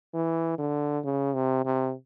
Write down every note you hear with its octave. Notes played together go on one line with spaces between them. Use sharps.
E3
D3
C#3
C3
C3